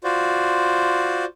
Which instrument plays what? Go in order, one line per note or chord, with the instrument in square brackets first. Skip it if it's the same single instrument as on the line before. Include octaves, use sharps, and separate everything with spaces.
[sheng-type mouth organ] F4 F#4 C5 D5